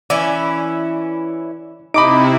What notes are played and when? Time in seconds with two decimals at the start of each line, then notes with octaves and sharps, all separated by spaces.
0.10 E3 C#4 E4 D5
1.94 C3 D#4 E4 D#5 B5 D6 D7